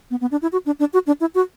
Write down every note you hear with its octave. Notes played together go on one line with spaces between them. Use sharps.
B3
B3
D4
E4
F#4
D4
D4
F#4
D4
E4
F#4